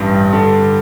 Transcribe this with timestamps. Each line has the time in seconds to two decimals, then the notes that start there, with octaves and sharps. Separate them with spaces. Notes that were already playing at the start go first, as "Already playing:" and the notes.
Already playing: A1 G2
0.32 D3